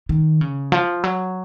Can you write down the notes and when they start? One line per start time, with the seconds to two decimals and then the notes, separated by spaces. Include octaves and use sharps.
0.09 D#3
0.41 C#3
0.72 F3
1.04 F#3